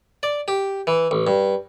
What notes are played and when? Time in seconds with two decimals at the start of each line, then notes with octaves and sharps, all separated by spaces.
0.23 D5
0.48 G4
0.87 E3
1.11 A1
1.27 G2